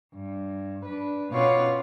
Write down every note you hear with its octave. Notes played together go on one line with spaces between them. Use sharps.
G2
D4 B4
B2 C#4 F4 B4 C#5 D6